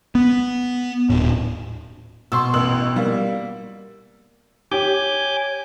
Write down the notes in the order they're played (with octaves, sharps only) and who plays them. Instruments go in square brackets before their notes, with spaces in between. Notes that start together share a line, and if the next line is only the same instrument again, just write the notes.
[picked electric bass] B3
D#1 A2
[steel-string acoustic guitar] B2 [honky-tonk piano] C6 C#6 E6
[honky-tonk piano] A1 E6 F#7
G3 A#3
[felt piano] G4 [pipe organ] C#5 [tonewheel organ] G#5 D6 G6